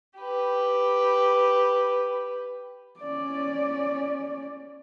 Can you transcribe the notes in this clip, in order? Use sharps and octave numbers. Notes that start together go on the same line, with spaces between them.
G4 B4
C#4 D5